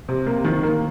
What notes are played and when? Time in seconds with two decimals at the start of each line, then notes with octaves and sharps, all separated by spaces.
0.09 C3
0.26 A#3
0.44 D#3
0.63 A#3